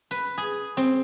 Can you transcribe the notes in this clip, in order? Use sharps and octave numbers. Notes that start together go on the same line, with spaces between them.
B4
G#4
C4